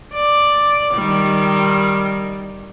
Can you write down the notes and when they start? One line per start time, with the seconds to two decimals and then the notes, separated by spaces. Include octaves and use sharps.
0.13 D5
0.94 D#3 G3